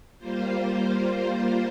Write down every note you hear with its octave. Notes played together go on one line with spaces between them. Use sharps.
G3 A#3 F4 C5